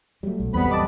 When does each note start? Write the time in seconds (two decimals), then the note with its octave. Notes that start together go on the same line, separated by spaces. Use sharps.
0.23 F#3 G3 A3
0.40 B1
0.53 A1 E2 G3 B3 C4 B4 B5
0.71 C3 D#5 A5 D6